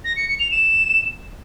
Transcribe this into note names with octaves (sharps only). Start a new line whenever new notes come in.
A#6
C#7
C#7
F7
E7